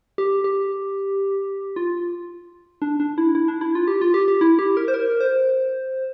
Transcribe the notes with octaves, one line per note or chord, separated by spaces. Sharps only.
G4
G4
F4
D4
D4
E4
E4
D4
E4
F4
G4
F4
G4
G4
E4
G4
A#4
C5
A#4
C5